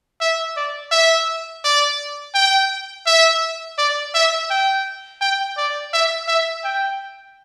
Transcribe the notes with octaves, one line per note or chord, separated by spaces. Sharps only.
E5
D5
E5
D5
G5
E5
D5
E5
G5
G5
D5
E5
E5
G5